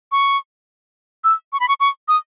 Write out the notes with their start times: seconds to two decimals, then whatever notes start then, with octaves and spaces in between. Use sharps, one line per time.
0.12 C#6
1.24 E6
1.53 C#6
1.60 B5
1.68 C#6
1.80 C#6
2.08 D#6